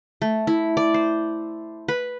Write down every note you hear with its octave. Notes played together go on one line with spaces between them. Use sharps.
A3
E4
D5
C5
B4